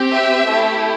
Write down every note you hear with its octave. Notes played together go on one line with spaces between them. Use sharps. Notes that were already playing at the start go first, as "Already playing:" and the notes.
Already playing: C4 G4
E5
A3 E4 G4